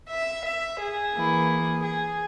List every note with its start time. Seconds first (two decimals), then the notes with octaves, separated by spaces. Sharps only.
0.09 E5
0.44 E5
0.80 G#4
1.14 E3 A#3 E4
1.83 G#4